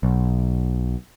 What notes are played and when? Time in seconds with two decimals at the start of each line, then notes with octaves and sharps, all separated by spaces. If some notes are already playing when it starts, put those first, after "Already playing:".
0.03 B1